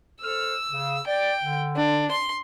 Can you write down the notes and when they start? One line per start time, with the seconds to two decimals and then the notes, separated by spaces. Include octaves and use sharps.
0.22 A4 C5 E6 F6
0.71 C#3
1.08 D5 G5
1.42 D3
1.76 D4
2.11 C6